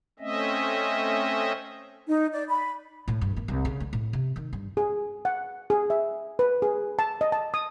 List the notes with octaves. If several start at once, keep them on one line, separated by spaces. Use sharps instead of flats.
A3 C4 C#4 D#5 E5
D#4
D5
B5
A2
G2
A#3
C2
C#3
A3
A2
C3
D#3
G2
G#4
F#5
G#4
E5
B4
G#4
A5
D#5
A5
D#6